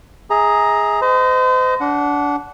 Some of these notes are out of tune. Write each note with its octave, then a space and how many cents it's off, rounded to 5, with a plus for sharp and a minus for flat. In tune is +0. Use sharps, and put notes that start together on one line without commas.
G#4 +0 E5 -45 A#5 +5
C5 -40 D#5 +0
D4 -25 F#5 +0